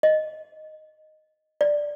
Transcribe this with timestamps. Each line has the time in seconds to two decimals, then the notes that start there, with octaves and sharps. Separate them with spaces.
0.03 D#5
1.61 D5